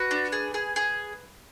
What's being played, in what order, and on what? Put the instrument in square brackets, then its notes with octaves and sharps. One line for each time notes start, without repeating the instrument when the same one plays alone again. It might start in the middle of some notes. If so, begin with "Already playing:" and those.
Already playing: [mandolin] F#4 B4
D4
G#4
G#4
G#4